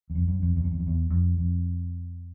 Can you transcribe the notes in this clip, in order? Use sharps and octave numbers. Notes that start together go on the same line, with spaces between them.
E2
F2
F#2
F2
E2
F2
E2
F2
E2
F2
F2